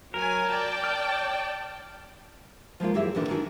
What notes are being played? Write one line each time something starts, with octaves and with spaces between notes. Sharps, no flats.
F#3 A#4 G#5
D5 G5 A5
F6
F3 G#3 A#3 F4
F#2 E3 G4 G#4 E5
E2 A#2 D3 D#3 D4
D#3 E3 D4 F#4 G#5